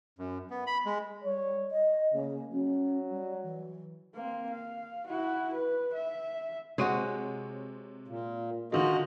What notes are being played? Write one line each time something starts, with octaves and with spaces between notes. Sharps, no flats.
F#2
B3
B5
G#3
G3 C#5
D#5
C#3 A#3
F#3 C#4
G3
E3
A#3 C4
F5
E4 F#4
B4
E5
C3 G#3 F#4 C#5 D#7
A#2
D3 D#3 G#3 F4 F#4 D#5